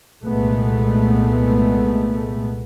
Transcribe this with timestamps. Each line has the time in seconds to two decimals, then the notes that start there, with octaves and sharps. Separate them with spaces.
0.23 C2 A#2 G#3 A3 B3